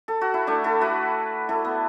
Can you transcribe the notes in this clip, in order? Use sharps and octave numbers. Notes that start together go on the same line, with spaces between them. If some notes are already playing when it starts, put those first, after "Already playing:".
A4
F#4
E4
A3 D4
E4 A4
F#4 B4
E4 A4
B3